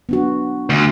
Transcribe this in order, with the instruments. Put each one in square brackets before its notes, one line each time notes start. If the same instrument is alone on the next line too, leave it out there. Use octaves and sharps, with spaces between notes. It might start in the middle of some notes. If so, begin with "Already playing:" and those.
[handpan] B3 D4 F#4
[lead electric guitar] D2